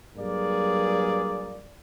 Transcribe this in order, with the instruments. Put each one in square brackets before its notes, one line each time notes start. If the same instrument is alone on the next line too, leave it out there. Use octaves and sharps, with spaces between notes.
[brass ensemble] G2 F#3 A#3 G#4 D5